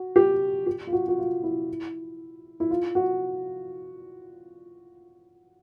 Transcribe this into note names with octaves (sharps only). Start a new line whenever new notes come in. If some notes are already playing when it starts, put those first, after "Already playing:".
Already playing: F#4
G4
G4
F4
F#4
F#4
F4
E4
E4
F4
F#4